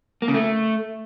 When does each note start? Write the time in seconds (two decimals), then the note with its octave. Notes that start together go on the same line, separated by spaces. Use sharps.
0.22 A#3
0.28 C#3
0.34 A3